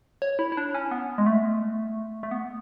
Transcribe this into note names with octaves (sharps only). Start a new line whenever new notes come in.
C#5
E4
E4
D4
C#4
B3
G#3
A3
A3
B3